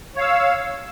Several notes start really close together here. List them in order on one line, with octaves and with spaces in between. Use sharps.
C#5 F5 E6